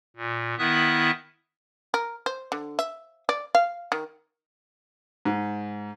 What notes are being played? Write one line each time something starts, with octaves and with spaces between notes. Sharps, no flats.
A#2
D#3 B3 E4 E5 D#6 F#6
A#4
C5
D3
E5
D5
F5
D#3
G#2